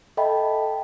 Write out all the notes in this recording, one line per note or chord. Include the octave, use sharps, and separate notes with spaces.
A4 D#5 E5 G5 A5 B5